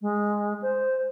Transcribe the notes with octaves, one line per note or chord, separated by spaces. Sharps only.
G#3
C5